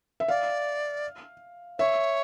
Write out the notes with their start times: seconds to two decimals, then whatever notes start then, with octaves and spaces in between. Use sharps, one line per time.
0.20 E5
0.28 D5 F5
1.79 C#5 E5